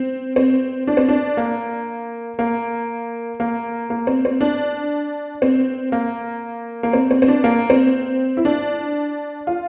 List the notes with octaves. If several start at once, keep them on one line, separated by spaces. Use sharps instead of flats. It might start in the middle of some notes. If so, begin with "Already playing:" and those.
Already playing: C4
C4
D4
C4
D4
A#3
A#3
A#3
A#3
C4
C4
D4
C4
A#3
A#3
C4
C4
C4
D4
A#3
C4
E4
D4
F4